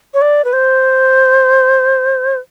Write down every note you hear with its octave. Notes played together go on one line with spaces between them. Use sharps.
C#5
D5
B4
C5